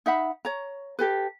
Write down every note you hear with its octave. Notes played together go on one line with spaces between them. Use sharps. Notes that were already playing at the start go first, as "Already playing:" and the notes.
D#4 E5 F#5 B5
C#5 A#5
G4 A4 B4